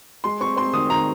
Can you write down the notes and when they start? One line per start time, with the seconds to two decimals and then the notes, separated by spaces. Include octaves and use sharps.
0.24 G#3 C6
0.40 C4 C#6
0.56 C4 C6
0.73 D#3 D#6
0.90 D#3 A#5